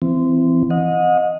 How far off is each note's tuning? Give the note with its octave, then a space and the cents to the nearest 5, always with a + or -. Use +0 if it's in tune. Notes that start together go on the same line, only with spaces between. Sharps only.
E3 +20 C4 -20
D#5 +0 F#5 -40